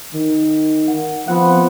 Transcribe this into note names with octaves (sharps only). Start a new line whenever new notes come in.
D#3
F#5
F3 B3 C4 F#5